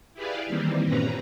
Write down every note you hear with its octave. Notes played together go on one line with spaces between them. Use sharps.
E4 G4 G#4 B4 D5 F5
D#3 E3 G3 A#3 C4
G2 A#2 C4 C#4 B4 A#5